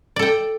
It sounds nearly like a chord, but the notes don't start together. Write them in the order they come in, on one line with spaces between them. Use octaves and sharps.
D5 A4 G5